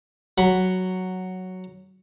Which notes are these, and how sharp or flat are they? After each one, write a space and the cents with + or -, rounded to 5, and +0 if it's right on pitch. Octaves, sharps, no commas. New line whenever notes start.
F#3 +0 B5 +0